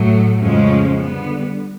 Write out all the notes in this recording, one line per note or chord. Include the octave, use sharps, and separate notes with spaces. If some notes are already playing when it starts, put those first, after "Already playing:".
Already playing: A2 F#3 A3
F2 C#3 F3 G#3 C#4
D3 G3 B3